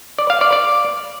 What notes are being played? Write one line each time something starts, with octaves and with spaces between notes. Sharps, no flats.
D5
F5
D5
D5